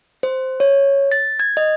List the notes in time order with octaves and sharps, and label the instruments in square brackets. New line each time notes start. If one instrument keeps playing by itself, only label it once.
[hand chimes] C5
C#5
A6
G#6
D#5